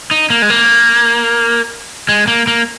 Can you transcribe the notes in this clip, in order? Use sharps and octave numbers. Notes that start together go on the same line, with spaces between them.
D#4
A#3
G#3
A#3
G#3
A#3
A#3